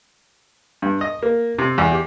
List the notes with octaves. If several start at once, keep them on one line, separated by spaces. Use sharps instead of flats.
G2
D#5
A#3
C3
E2
G4